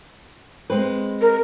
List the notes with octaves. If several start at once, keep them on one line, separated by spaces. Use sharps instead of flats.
G#3 C4 B4
A#4